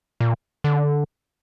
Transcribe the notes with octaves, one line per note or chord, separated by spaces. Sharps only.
A#2
D3